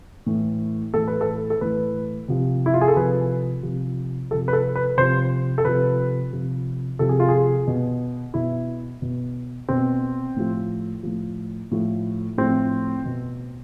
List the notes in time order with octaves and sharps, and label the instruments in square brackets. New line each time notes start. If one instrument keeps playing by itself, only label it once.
[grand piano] A2 E3
A2 E3 A4
B4
A4
A4
A2 E3 B4
C3 F3
E4
F4
G#4
A4
C3 F3 B4
C3 F3
C3 F3 A4
B4
A4
B4
C3 F3 C5
A4
C3 F3 B4
C3 F3
C3 F3 A4
G#4
F4
G#4
B2
B2 E4
B2
B2 C4
A2 F3
A2 F3
A2 F3
A2 F3 C4
B2